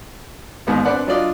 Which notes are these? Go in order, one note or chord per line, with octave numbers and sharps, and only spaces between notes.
A1 D#2 G#2 B3
C4 D4 B4 D5 F#5
F#3 D4 F4 D5 D#5